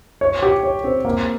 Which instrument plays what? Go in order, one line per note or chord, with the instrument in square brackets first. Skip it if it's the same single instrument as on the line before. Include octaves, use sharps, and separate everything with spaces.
[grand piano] C#5
G4
C#5
C4
A#3